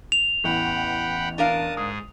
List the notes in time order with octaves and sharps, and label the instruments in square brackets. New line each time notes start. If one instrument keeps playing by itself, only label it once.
[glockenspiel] F7
[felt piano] A1 E2 [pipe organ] F#5 G5 B5
[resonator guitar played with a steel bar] D4 A#4 F5 [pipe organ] A5 D#6
[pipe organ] G#2 G#4 [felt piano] D#6